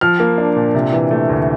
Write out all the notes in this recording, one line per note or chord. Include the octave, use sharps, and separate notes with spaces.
F3 F6
A#3
D4
A#2
C3
E3
A3
D2